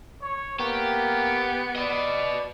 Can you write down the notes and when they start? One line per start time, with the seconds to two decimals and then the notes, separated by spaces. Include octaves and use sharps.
0.22 C#5
0.59 A#3 B3 G4
1.75 B4 D5 D#5